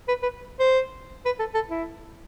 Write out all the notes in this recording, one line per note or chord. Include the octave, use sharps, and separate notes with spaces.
B4
B4
C5
B4
A4
A4
E4